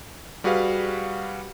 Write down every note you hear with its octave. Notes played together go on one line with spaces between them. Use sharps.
G3 F#4 G#4 B4 F5